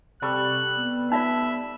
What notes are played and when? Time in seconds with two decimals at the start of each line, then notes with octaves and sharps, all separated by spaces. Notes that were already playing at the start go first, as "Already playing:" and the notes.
0.22 C3 G3 A4 C#6 F#6
0.78 B3
1.12 D#4 F4 D5 E5